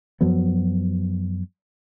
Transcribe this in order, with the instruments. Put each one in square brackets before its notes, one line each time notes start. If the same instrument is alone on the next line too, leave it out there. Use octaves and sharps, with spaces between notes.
[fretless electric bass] F#2 F3 F#3 B3